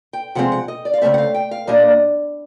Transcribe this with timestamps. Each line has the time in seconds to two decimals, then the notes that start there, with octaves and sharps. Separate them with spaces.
0.13 G5
0.35 C3 F3 G#3 C4 F#5
0.52 F#5
0.68 D#5
0.85 D5
0.94 F5
1.01 C#3 F3 A3 C4 E5
1.14 F#5
1.18 F5
1.34 G5
1.51 F5
1.67 A#2 G3 A#3 D4 D#5